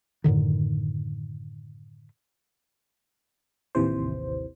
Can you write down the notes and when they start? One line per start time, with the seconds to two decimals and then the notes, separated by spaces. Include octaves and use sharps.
0.24 F#2 A2 D3 D#3
3.75 A1 D#2 C3 E3 C5